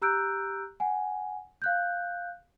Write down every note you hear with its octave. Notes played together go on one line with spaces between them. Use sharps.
G4 A#5 E6 F#6 G6 D7
F#5 G#5
F5 F#6 G6